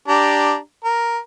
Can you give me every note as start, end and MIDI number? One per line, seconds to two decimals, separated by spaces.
0.08 0.57 62
0.08 0.57 67
0.08 0.57 82
0.84 1.18 70